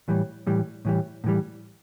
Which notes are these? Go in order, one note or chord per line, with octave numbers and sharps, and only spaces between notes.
A2 E3 G3
A2 E3 G3
A2 E3 G3
A2 E3 G3